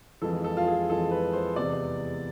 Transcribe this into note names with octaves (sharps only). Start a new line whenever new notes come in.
F2 E3 G#3 A4
A4
F4
G#4
F2 E3 G#3 A4
B4
C5
E2 C3 G#3 B3 D5